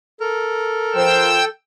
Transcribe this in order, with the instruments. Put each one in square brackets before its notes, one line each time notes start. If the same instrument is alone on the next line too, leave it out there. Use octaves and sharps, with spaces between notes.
[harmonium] A4 [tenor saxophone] A#4
[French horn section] F3 C5 [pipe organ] G5 E6